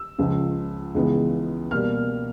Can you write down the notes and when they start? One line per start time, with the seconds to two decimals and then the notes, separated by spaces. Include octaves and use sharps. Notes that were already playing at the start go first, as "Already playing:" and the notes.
Already playing: E6
0.18 C#2 C#3 F3
0.95 C#2 C#3 E3 G#3 B3
1.71 B2 G3 A#3 F6